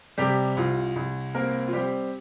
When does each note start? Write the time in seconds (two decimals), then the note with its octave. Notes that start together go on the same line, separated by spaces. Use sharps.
0.18 C3 G3 G4
0.57 C2 F4
0.96 C2
1.34 A#3 C4 A#4
1.68 F4
1.73 G3 C4 G4